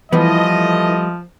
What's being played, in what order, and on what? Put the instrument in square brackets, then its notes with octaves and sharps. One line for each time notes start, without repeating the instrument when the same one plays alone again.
[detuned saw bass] E3 [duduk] F3 [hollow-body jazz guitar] G3 B3 [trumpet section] A3 A4 D#5